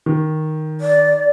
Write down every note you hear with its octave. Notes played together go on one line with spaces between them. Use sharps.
D#3
D5